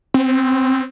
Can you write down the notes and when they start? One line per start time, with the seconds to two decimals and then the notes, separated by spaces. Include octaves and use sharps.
0.14 C4